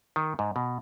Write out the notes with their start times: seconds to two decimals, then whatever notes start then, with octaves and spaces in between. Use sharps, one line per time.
0.16 D#3
0.39 G#2
0.56 B2